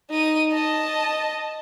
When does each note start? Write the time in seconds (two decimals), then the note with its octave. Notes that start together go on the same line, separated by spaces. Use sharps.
0.10 D#4 D#7
0.53 D#5 A5